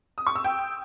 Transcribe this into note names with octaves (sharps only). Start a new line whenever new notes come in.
D#6
C#6
E6
G5